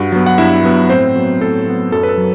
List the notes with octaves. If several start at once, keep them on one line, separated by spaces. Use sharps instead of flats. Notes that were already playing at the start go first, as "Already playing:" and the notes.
Already playing: G2 F#4 F#5
F#3 B3
F#5
G2 E4 E5
F#3 B3
A2 C4 C5
F#3 B3
A2 A4
F#3 B3
F#2 A4
B4
A4
F#3